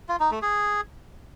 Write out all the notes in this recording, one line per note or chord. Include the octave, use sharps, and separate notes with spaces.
F4
D#4
A3
G#4